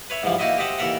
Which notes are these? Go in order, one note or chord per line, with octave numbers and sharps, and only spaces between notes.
B4 C#5 E5
G#2 E3 F3 G3
A#3 D#4 E4 F#4 D#5 E5
G4 C5 D#5 E5 F#5 A5
D#2 E3 A4 A#4 E5 F#5